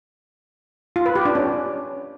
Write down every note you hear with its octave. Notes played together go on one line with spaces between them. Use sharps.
F4
B4
G4
D4
C#4